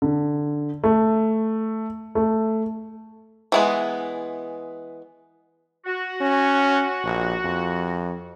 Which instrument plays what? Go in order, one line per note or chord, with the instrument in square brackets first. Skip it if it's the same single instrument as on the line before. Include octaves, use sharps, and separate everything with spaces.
[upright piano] D3
A3
A3
[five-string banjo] E3 G#3 B3
[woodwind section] F#4
[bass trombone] C#4
A#1
F2